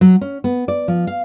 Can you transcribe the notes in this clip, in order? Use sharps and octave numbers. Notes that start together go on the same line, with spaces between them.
F#3
C#4
B3
D5
F3
F5